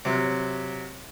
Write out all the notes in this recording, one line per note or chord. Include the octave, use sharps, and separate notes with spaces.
C3 F#3